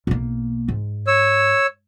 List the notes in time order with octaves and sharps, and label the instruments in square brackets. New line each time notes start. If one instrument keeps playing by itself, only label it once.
[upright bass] B1 A#3
G#2
[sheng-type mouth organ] C#5 E6